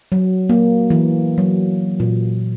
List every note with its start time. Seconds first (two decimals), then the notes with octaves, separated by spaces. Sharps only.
0.12 F#3
0.49 A#3
0.90 E3
1.38 F#3
2.00 A#2